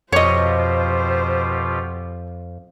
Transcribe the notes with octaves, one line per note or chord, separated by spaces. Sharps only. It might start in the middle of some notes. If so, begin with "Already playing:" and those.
F2 B2 F4 G4 C5 C#5 D#5